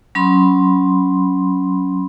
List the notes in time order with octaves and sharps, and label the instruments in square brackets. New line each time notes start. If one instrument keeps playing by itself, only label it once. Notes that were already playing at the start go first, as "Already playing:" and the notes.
[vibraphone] F#3 C#4 B5 C6